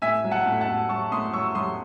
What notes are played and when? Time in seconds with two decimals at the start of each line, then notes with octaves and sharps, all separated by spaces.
0.02 A2 E5 G#5
0.25 F#3
0.31 F#5 A5
0.46 A2
0.61 F#5 A5
0.68 A2
0.89 F#3 A5 C#6
1.12 A2 C6 D#6
1.33 F#3 C#6 E6
1.55 F#3 C6 D#6